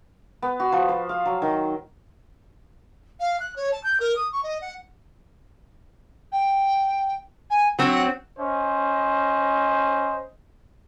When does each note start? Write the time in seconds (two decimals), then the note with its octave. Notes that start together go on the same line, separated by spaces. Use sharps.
0.42 B3
0.60 F#4
0.72 F3
0.89 C5
1.09 F5
1.25 F#3
1.42 D#3
3.20 F5
3.40 F#6
3.56 C#5
3.72 A5
3.84 G6
4.00 A#4
4.16 D#6
4.32 C#6
4.43 D#5
4.62 F#5
6.32 G5
7.50 G#5
7.79 F#3 C4 F#5
8.39 C#4 C5 D#5